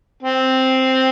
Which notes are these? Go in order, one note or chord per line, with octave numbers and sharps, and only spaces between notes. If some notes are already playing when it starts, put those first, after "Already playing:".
C4